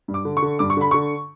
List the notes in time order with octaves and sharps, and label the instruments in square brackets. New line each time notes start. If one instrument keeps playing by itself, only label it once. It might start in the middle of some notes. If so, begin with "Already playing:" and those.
[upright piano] G2
D6
D3
C#6
D3
G2 D6
C#6
D3 B5
D3 C#6